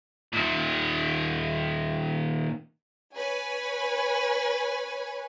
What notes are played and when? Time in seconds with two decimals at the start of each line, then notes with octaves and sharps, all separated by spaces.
0.33 A#2 D#3
3.15 B4 C#5 G#5